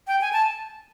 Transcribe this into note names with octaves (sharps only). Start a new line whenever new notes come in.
G5
G#5
A5